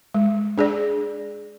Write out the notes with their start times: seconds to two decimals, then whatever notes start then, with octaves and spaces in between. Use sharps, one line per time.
0.14 G#3
0.58 D4 G#4 D5